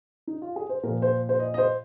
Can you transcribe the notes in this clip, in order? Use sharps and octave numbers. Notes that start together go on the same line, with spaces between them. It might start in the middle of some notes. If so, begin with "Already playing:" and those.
D#4
F4
G#4
C5
A#2 F3 A#4
C5
C5
D#5
D#5
C5